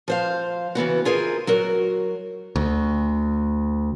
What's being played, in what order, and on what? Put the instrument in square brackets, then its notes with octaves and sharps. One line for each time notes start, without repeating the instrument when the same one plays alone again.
[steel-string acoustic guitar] F3 C5 F5
C#3 E3 B3 F#4
F4 G#4 A#4 C5 D5 E5
F#3 F#4 A#4
[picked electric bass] D2